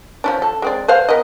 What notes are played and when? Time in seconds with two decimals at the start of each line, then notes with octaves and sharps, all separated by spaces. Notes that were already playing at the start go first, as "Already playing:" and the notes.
0.24 F3 C#4 D4
0.42 A4
0.62 G#3 C4 D5
0.88 B4 C5 F5
1.09 B3 A#4 D#5